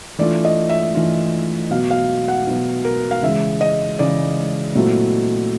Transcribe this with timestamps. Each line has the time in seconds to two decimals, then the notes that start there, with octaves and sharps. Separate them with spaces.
0.19 E3 A3 D4 F4 D5
0.45 D#5
0.69 E5
0.94 E3 A3 D4 F4
1.70 B2 F#3 B3 F5
1.91 F5
2.28 F#5
2.47 B2 F#3 B3
2.85 A#4
3.11 F5
3.22 C#3 E3 G#3 E5
3.61 D#5
3.99 C#3 E3 G#3 D5
4.75 A#2 F#3 A3 C4 E4